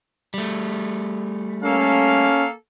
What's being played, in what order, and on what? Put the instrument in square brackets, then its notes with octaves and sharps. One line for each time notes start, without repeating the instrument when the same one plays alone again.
[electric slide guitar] G3 A3
[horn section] A#3 A4 F5 [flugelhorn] C#4